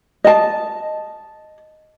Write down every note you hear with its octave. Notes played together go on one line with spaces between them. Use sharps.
D#5 A5